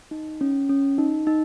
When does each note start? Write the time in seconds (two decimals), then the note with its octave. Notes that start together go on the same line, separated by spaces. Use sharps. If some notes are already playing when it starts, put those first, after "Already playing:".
0.11 D#4
0.41 C#4
0.69 C#4
0.98 D#4
1.27 D#4